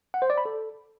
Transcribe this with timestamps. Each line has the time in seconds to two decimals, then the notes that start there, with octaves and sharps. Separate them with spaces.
0.14 F#5
0.22 C5
0.30 D5
0.38 B5
0.45 A4